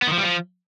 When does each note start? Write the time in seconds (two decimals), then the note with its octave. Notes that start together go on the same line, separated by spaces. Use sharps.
0.02 B3
0.07 D#3
0.13 F3
0.18 G3
0.23 F3